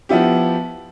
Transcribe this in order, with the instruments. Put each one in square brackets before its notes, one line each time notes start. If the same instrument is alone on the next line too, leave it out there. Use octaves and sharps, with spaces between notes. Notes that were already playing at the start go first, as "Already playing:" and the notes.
[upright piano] F3 B3 E4 G4